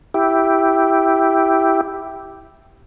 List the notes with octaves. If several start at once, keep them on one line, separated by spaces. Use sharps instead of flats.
E4 G4